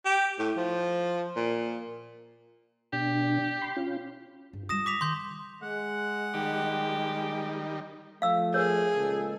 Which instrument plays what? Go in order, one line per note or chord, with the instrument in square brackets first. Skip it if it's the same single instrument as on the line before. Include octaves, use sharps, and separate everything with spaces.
[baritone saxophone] G4
A2
F3
A#2
[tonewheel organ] B2 D4 [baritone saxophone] G4
[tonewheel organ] B5 C6
C#4 F4
[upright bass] G2
[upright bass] G3 F4 [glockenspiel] D#6 A#6 E7
[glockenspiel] D6 B6 F7
[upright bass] D#3 [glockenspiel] C6 G6
[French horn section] G#3 [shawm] F#5
[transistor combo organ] D#3 G3 [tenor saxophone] G4
[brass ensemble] F3 A3 [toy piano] F5 E6
[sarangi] G#4 [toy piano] A#4 C#5
[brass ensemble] C#2 A#2 A4